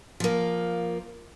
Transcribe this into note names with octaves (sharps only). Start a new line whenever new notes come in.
F3 A#3